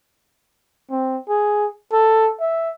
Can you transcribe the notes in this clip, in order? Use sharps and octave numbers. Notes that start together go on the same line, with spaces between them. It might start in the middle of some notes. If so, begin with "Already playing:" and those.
C4
G#4
A4
E5